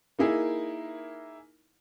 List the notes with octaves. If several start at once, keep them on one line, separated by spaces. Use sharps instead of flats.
A#3 D#4 E4 G#4 A#4